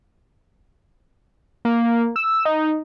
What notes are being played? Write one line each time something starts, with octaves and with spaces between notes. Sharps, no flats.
A#3
E6
D#4